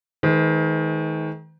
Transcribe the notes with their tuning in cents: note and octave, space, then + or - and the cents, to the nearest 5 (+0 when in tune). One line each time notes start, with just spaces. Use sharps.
D#3 +30 G#3 +45 C5 -45